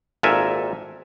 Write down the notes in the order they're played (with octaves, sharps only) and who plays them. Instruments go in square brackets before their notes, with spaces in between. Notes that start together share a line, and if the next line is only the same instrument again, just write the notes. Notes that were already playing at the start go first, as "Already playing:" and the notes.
[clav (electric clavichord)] G#1 A#2 A4 A#4 E5 G#5